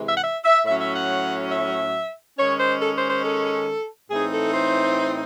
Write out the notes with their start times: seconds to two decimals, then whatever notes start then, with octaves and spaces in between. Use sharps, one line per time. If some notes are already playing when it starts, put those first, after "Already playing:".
Already playing: C3 E3 G#3
0.09 E5
0.17 F#5
0.24 E5
0.45 E5
0.66 A2 F#3 C#4 E5
0.81 E5
0.95 F#5
1.52 E5
2.39 D#3 G#3 C#4 C#5
2.60 C5
2.82 A4
2.96 C5
3.10 C5
3.25 A4
4.10 A2 E3 C4 D#4 G#4
4.31 A4
4.53 C5